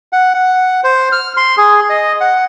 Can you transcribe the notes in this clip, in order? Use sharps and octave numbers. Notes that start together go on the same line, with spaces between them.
F#5
F#5
C5
F6
C6
G#4
D#5
F#5